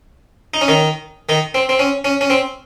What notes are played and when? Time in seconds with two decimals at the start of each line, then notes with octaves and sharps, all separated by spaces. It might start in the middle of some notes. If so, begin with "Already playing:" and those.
0.54 D#4
0.61 C#4
0.68 D#3 D#4
1.29 D#3 D#4
1.54 C4
1.69 C4
1.79 C#4
2.04 C#4
2.21 C#4
2.30 C4